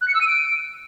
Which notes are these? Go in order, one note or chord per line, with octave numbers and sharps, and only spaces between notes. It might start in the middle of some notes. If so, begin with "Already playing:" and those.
F#6
C#7
E6
D#7
D7